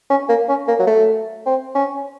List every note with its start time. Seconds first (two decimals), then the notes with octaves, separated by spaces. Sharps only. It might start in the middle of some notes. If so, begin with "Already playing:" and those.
0.10 C#4
0.29 A#3
0.49 C#4
0.68 A#3
0.79 F#3
0.87 A3
1.46 C4
1.75 C#4